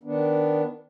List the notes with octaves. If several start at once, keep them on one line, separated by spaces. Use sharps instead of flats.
D#3 B3 D4